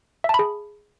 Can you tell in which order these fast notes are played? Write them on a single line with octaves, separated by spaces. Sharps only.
E5 A5 B5 G#4